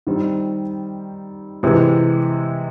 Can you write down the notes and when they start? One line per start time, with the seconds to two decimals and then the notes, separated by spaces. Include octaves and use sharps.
0.07 D#3 G3 C4
1.63 C3 E3 G#3